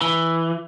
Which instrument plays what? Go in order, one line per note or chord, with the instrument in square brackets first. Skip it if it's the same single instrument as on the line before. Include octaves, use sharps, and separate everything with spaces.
[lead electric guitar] E3